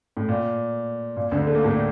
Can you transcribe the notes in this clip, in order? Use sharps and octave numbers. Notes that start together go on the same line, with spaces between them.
A2
A#2
A#2
D2 D3
A3
A#3
A2 A3